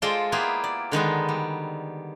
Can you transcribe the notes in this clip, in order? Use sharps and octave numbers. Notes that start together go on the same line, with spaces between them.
G#3 F4 A4 C5 D5 G5
A#3 B3 E4 F4 G4 G#4
D5
D3 D#3 G#3 B3
G3